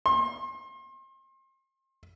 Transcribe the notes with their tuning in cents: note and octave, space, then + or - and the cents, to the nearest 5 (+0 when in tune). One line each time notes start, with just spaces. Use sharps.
C6 +35